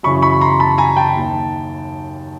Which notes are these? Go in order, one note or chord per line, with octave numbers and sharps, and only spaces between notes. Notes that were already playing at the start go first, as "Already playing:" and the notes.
F#2 C#3 E3 B5 C#6
B5 C#6
A#5 C6
A5 B5
G#5 A#5
G5 A5
D#2 D#3